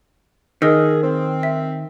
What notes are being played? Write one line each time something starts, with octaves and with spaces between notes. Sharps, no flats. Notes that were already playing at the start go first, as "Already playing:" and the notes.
D#3 G#4 A#4 D#5 E6
C4
E5